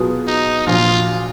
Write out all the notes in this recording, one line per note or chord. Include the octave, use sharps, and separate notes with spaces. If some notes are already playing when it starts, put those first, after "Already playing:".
Already playing: B2 F#3 B3 F4 G#4
D#4
A#1 A#2 F#3 F4